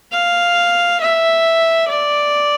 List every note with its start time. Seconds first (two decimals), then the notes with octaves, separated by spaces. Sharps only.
0.13 F5
1.01 E5
1.88 D5